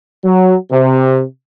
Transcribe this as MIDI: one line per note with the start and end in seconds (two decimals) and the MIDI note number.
0.23 0.54 54
0.71 1.22 48